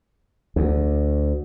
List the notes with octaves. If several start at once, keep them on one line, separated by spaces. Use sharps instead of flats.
D2